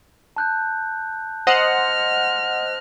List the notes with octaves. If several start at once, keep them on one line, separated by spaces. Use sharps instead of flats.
A5 F#6 G6
C5 D#5 F#5 F6 A#6